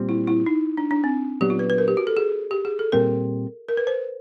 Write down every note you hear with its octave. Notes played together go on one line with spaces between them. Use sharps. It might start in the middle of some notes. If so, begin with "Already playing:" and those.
Already playing: A#2 G3 C4
E4
E4
D#4
D4
D4
C4
A#2 F#3 B3 D4 G4
F4
B4
B4
A#4
G4
F#4
A4
G#4
G4
G#4
A4
A#2 G3 C4 A#4
A#4
B4
C5